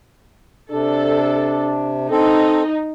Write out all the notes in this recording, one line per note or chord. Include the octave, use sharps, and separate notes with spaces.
C3 D4 A4
C4 D#4 A4